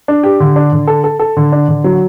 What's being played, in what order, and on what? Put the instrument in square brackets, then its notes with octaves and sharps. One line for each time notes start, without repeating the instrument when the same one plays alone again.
[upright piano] D4
G4
D3
D4
D3
A4
A4
A4
D3
D4
D3
F#3